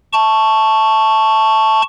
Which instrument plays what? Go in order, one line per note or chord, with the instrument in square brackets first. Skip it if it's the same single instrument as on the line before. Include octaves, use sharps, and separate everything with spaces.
[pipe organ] A5 C#6